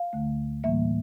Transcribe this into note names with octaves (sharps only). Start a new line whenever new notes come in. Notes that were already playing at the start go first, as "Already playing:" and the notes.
Already playing: F5
D2 D3 A3
A2 E3 G3 A#3 E5